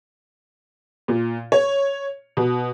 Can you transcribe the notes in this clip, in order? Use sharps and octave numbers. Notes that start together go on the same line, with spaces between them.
A#2
C#5
B2